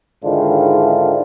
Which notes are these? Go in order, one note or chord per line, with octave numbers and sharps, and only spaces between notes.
G#2 D3 D#3 D4 E4 F4